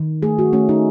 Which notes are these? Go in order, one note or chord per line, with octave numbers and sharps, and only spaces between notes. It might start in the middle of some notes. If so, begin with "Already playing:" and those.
Already playing: D#3
A3 G#4
F#4
A3 C#4
D#4